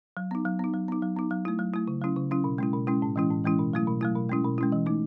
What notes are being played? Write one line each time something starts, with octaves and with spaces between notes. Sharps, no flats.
F#3
B3 D#4
F#3
B3 D#4
F#3
B3 D#4
F#3
B3 D#4
F#3
A3 E4
F#3
A3 E4
C#3
F#3 C#4 E4
C#3
F#3 C#4 E4
B2
G#3 C#4 E4
B2
G#3 C#4 E4
A2
E3 G#3 C#4 E4
A2
E3 G#3 C#4 E4
B2
F#3 A3 E4
B2
F#3 A3 E4
B2
G#3 C#4 E4
B2
G#3 C#4 E4
E3
A3 D#4